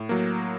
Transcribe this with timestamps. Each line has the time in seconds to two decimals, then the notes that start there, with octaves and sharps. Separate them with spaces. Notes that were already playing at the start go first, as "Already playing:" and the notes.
Already playing: A2
0.09 F#3 A#3